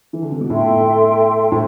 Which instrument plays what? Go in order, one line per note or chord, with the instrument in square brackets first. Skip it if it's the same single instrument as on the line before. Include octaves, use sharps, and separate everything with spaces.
[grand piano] E3
D3
C3
B2
[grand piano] A2 [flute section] A4 E5 G5 C6
[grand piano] A2 [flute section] C5